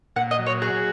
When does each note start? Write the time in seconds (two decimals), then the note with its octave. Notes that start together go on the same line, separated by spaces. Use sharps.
0.16 A#2 F#5
0.31 D#5
0.39 F#3
0.46 C#5
0.62 F#4 G#4